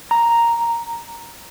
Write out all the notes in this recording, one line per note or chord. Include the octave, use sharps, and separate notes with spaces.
A#5